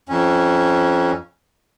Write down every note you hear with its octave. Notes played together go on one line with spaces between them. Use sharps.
F2 C#4